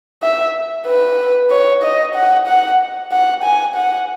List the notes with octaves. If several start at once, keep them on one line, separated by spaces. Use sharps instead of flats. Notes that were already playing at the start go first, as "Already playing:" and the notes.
E5
B4
C#5
D#5
F#5
F#5
F#5
G#5
F#5